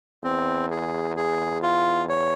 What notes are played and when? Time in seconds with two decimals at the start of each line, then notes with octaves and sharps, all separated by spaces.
0.23 E2 C4
0.71 G#4
1.16 G#4
1.63 F4
2.09 C#5